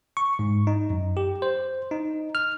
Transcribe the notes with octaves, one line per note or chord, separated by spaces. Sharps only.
C#6
G#2
D#4
F#2
G4
C5
D#4
F6